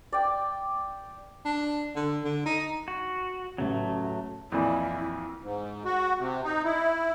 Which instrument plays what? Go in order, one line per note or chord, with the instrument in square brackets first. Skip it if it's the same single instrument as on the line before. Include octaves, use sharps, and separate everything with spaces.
[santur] D5 G5
[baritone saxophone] D4
D3
D3
D#4
[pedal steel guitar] F#4
[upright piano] A1 C#3 [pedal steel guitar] F#3 A3
[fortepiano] F2 A#2 E3 [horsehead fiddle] E4
[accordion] G#2
F#4
C3
D#4
E4